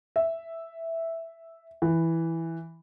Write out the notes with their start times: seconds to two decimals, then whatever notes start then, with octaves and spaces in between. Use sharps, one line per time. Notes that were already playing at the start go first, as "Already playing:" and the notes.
0.16 E5
1.82 E3